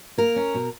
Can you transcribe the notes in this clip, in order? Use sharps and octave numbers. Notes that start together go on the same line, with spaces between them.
A#3 A#4
C#4
B2